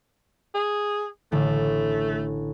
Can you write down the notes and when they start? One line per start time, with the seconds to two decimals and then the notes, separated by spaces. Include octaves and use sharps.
0.54 G#4
1.32 A1 D3 A3